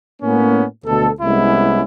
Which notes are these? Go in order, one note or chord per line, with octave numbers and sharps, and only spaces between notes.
A2 A#3 B3 C#4
D2 B2 A4
C2 G#3 B3 C#4 E4